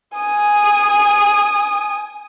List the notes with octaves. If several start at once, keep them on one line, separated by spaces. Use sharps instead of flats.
G#5 D#6